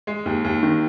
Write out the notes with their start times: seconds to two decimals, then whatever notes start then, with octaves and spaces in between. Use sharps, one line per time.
0.07 G#3
0.26 D#2
0.44 D#2
0.63 D#3